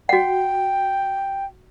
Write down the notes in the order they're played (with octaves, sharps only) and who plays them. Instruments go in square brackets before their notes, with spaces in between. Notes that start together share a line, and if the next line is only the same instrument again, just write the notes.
[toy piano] F#4 F#5 [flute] G5